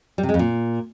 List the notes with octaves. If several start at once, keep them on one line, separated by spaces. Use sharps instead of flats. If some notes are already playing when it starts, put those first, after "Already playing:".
G3
C3
G#3
F2
A#2